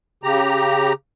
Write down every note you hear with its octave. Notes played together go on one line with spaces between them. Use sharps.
C#3 G4 A#5